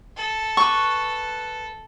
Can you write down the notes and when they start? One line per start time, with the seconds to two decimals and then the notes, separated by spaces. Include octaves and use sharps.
0.16 A4
0.57 B4 C#6